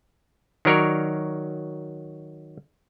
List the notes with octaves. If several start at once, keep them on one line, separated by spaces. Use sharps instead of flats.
D#3 F#3 A#4 C#5 D5